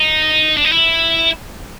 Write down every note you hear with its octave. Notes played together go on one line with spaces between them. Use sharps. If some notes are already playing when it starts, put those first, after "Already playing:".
Already playing: D#4
D4
D#4
E4